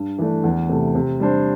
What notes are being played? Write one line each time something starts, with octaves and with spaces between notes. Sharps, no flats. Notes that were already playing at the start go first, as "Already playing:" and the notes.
Already playing: G2
E3 A3 D4
E2
C3 A3
C3
G3 D4 C5